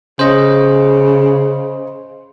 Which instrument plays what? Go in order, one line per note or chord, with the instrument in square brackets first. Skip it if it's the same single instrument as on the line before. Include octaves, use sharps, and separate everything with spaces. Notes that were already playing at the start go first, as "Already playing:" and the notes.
[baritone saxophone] C#3 [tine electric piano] C5 D#5